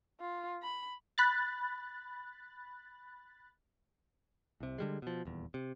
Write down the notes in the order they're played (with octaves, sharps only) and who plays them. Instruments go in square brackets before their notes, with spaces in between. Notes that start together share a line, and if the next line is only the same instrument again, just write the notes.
[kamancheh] F4
B5
[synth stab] B5 F#6 A6
[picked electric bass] C2 C3
D3 G3 G#3
B2 F3
D#1 E2
C3